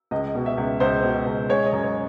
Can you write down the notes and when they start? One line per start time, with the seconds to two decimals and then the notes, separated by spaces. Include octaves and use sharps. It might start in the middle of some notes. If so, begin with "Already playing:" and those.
0.11 C#2 D#5
0.35 B2
0.46 E5
0.58 C#2
0.80 C#2 C5
1.03 B2
1.26 C#2
1.49 G#3 C#5
1.66 D#5
1.73 F#2
1.83 C#5